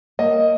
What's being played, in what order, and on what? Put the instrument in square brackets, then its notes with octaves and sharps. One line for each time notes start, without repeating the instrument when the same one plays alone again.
[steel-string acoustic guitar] A#3 [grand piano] D#5